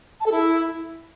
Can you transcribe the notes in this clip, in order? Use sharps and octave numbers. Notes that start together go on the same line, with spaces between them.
A5
A4
E4